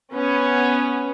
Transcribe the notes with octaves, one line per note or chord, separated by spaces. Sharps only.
B3 C#4